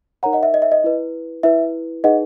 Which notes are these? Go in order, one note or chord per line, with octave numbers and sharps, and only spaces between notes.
D#4 A#4 C#5 F#5 A#5
D#5 F#5
E5
D#5
E5
D#5
E4 B4
E4 B4 E5
D#4 G#4 B4 D#5 F#5